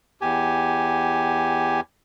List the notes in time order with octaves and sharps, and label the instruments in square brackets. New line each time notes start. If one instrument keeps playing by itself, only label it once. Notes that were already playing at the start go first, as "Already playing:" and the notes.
[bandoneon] E2 G4 G#5